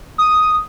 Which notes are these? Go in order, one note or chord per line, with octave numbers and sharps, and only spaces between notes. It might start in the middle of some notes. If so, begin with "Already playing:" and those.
D#6